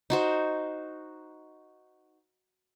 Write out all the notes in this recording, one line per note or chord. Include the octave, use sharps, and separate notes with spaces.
D#4 F#4 C5